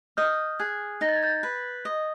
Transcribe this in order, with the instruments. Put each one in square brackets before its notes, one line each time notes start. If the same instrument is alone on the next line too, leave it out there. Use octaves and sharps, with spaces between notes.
[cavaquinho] D#5 [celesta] F6 G6
[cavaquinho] G#4 [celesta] F#6 G#6
[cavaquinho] D#4 [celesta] A#6
[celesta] A6
G#6
G6 A6
[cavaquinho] B4
D#5